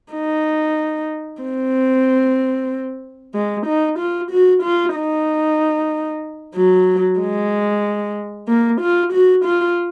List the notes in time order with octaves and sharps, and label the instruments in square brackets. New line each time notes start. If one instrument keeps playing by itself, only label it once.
[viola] D#4
C4
G#3
D#4
F4
F#4
F4
D#4
F#3
G#3
A#3
F4
F#4
F4